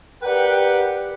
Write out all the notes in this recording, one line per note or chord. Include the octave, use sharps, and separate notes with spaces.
G4 A#4 B4 D5 F#5 G5